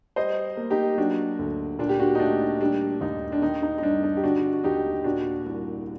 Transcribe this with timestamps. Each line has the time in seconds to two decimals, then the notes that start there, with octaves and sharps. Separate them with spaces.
0.16 G3 C5 D#5
0.57 A#3
0.70 D#4 G4
0.98 F#3 D4 F#4
1.39 D2
1.79 A#2 D4
1.89 G4
1.99 D4 F#4
2.15 D#4
2.19 A3 D4
2.61 G3 D4
3.01 D#2 D#4
3.32 D4
3.41 D#3 D#4
3.62 D#4
3.78 D#4
3.82 G2 D4
4.03 D#4
4.17 G4
4.23 D3 D4 F#4
4.53 F#4
4.64 D#2 D#4 G4
5.04 A#2 D4 F#4
5.46 C2